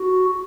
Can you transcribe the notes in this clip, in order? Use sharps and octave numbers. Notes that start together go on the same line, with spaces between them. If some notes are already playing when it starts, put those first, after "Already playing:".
Already playing: F#4